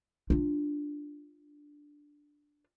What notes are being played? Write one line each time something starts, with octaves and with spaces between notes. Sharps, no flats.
D4 F4